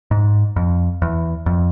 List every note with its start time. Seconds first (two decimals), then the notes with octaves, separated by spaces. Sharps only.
0.11 G#2
0.56 F2
1.02 E2
1.46 F2